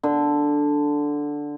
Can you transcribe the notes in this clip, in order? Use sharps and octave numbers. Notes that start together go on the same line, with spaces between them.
D3